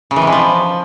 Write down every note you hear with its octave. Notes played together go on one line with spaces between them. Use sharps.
C#3
E3
C3
B2
F3